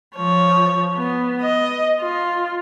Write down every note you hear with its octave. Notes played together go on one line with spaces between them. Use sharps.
F3 C#5
B3
D#5
F4